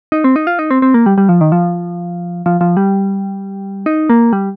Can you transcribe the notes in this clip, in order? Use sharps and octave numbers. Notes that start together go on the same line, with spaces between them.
D#4
C4
D#4
F4
D#4
C4
C4
A#3
G3
G3
F3
D#3
F3
F3
F3
G3
D#4
A#3
G3